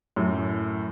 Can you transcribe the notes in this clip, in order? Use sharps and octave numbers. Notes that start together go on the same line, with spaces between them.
F#2 A2